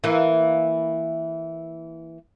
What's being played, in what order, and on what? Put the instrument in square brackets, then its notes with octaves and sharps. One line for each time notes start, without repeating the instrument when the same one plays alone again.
[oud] E3 A#3